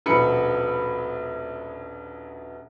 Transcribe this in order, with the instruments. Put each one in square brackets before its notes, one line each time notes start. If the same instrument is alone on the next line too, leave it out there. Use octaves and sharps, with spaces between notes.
[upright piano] D#1 A#1 B2 B5 C#7